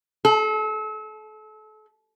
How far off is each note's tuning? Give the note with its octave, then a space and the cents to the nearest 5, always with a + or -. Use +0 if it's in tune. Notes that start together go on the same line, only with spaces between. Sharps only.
A4 -35